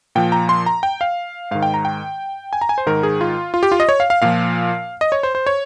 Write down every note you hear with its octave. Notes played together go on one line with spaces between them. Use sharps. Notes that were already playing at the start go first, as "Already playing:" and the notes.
A#2 F3 G5
A#5
C6
A#5
G5
F5
G#2 D#3 F5
G5
A#5
G5
G#5
A#5
G#5
C5
G#2 D#3 A#4
G#4
F4
F4
G4
F4
D#5
C#5
F5
F5
A#2 F3 F5
D#5
C#5
C5
C5
C#5